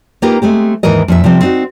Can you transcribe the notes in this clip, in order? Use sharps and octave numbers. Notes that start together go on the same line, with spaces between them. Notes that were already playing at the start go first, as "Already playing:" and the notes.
A#3 D#4 F4 G4 A#4 B4
G#3 A3 C4 G4
D#2 G#2 E3 E4 A#4 D#5
F2 A#2 E5
C3 F3 G3 C4
C4 D#4 F#4